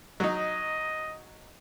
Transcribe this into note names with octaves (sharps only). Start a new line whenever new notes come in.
F#3 D#4 D#5